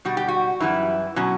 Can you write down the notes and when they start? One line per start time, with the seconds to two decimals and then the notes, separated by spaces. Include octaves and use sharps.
0.05 B2 G3 F#4
0.17 G4
0.28 F#4
0.60 F#2 E3 G3 E4
1.16 B2 F#3 C#4